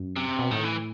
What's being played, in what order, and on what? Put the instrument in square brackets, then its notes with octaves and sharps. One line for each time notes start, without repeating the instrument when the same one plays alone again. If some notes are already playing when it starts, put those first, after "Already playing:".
Already playing: [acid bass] F#2
[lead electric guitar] C3
[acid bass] B2
[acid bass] A2 [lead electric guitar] D#3
[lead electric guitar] E3